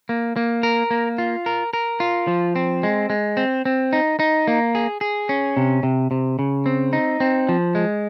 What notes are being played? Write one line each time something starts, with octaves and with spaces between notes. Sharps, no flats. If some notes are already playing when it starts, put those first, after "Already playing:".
A#3
A#3
A#4
A#3
F4
A#4
A#4
F4
F3
C4
G#3
G#3
C4
C4
D#4
D#4
A#3
G#4
G#4
C#4
C3
C3
C3
C#3
C4
D#4
C4
F3
G#3